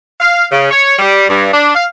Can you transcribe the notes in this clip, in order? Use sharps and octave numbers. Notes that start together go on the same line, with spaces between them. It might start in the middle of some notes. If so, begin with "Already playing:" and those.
F5
C#3
C#5
G3
G2
D4
F5